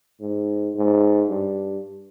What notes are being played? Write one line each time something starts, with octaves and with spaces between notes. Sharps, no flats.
G#2
G#2
G2